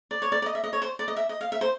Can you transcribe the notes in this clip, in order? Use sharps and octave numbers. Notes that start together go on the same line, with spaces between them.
D5
C#5
D5
D5
D#5
E5
D#5
C#5
C5
D5
D#5
E5
D#5
F5
E5
C5